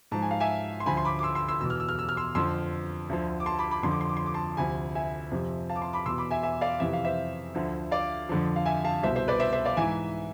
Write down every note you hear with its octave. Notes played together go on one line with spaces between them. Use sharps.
G#2 F3 A5
G#5
F5
E5 G#5
C6
D2 D3 F3 G#5 B5
C6
B5 D6
D6
C6 E6
C6 E6
C6 E6
E2 B2 E6
F6
E6
F6
E6
F6
C6 E6
F2 D3 F3 C6 E6
D2 D3 F3
D6
A5 C6
B5 D6
B5 D6
F2 D3 F3 C6
D6
C6
D6
C6
D6
A5 C6
D2 C3 F3 G#5 B5
E5 G#5
F2 C3 F3
F5 A5
D6
A5 C6
B5 D6
E2 B2 C6 E6
B5 D6
E5 G#5
E5 G#5
D5 F5
F2 C3 E3 E5
F5
C5 E5
D2 D3 F3
D5 F5
F2 D3 F3
F5
E5 G#5
F5 A5
C2 B2 C5 E5
C5 E5
B4 D5
C5 E5
C5 E5
D5 F5
G#2 E3 E5 G#5